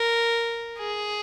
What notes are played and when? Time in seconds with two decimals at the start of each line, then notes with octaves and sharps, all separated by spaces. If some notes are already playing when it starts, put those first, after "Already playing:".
Already playing: A#4
0.79 G#4